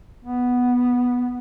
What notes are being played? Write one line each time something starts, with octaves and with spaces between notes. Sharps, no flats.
B3